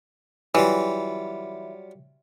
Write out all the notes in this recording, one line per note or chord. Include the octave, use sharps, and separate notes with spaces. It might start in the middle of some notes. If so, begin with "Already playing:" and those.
E3 F#3 G3 F4